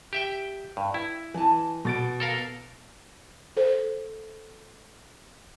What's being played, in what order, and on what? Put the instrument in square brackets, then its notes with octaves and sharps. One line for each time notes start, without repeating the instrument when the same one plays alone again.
[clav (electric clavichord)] G4 E5 G5
G2
E4
[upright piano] E3 [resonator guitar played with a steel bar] G#5 A5
[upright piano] B2 A6 D7
[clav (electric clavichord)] A4 A#4 F5
[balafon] A4 C5